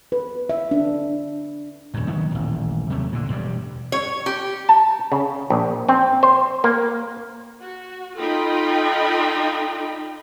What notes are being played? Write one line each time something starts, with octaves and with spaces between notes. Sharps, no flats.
B4
E5
D4
D#1 F#2
C2 D#3 F#3 B3
D#1 A1
D#2 C3 F#3 A3
A#2 D3
E1 G2 C3 G3
C#5
G4
A5
C#3
A#1
C4
C5
A#3
F#4
D#4 F4 A4 D#5 G5 B5